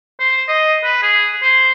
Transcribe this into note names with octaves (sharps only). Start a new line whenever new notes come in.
C5
D#5
B4
G#4
C5